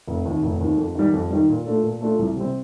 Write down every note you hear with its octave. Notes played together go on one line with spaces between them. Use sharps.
F1
D#2 D#3
F1
D#2 D#3
F2
D#3 G3
F2
D#3 G3
A#2
A3 D4 F4 A4
A#2
A3 D4 F4 A4
C2
C3 G3 C4